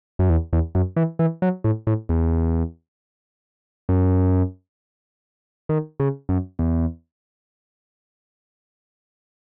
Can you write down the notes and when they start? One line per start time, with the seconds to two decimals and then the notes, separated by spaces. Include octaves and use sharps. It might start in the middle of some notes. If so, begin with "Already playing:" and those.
0.19 F#2
0.30 E2
0.53 E2
0.75 F#2
0.96 E3
1.19 E3
1.42 F#3
1.64 A2
1.87 A2
2.09 E2
3.89 F#2
5.69 D#3
6.00 C#3
6.29 F#2
6.59 E2